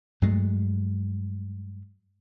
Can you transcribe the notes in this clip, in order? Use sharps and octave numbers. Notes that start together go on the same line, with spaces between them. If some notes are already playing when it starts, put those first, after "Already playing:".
G2 F#3 G#3 A3